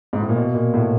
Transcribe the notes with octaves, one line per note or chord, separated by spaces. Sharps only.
G#2
A2
A#2
B2
A#2
A2